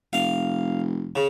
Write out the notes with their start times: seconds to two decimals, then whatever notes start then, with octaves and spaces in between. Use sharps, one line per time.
0.13 F1 F5
1.16 C#3